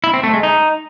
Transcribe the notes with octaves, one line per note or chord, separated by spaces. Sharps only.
E4
C4
A3
G#3
D#4